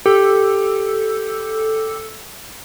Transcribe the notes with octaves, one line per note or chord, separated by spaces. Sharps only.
G4 A4